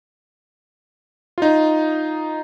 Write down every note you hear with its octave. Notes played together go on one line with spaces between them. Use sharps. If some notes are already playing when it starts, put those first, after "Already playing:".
D#4 F4